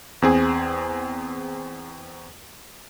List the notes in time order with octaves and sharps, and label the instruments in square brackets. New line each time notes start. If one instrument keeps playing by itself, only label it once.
[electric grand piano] E2 C4 G#4